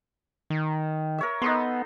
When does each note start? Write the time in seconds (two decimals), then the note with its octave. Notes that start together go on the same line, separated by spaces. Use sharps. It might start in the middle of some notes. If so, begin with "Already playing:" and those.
0.50 D#3
1.18 A#4 C#5 E5
1.42 B3 D#4 A4 C6